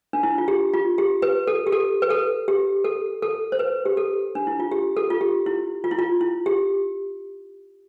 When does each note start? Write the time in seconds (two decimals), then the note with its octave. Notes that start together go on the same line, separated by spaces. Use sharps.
0.13 D4
0.23 E4
0.38 F4
0.48 G4
0.74 F4
0.98 G4
1.22 B4
1.47 A4
1.67 G4
1.72 A4
2.02 B4
2.10 A4
2.48 G4
2.84 A4
3.22 A4
3.52 C5
3.59 B4
3.85 G4
3.97 A4
4.35 D4
4.47 E4
4.60 F4
4.72 G4
4.97 A4
5.10 F4
5.21 G4
5.46 E4
5.84 F4
5.91 E4
5.99 F4
6.21 E4
6.46 G4